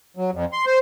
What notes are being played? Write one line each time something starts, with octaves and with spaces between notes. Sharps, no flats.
F#3
F2
C6
C5